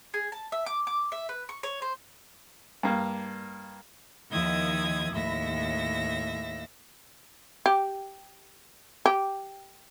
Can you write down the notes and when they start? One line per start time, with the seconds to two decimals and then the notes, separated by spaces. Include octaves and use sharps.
0.14 G#4
0.32 A5
0.52 E5
0.66 D6
0.87 D6
1.12 E5
1.29 B4
1.49 C#6
1.63 C#5
1.82 C5
2.83 G2 A#3
4.32 D#2 D#3 F3 E4 D#6 G#6
5.12 D#2 A2 E5 A#6
7.66 G4
9.06 G4